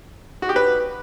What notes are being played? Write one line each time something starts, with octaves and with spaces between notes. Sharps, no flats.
F#4
G4
B4